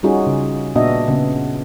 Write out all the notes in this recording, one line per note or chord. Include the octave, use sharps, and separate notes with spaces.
G3 C#4 D#4 F4 F#4 G#4
C#3
A#2 B3 D4 F#4 D#5 E5
C#3 B3